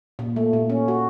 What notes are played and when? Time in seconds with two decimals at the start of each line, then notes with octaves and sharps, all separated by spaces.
0.19 A#2
0.36 A3
0.53 A#2
0.70 C#4
0.88 F#4